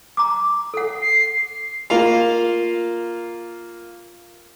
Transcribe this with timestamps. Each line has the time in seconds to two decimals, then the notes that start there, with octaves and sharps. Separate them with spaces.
0.17 A#5 D6
0.74 A4 F#5
1.02 C7
1.90 A#3 F4 F5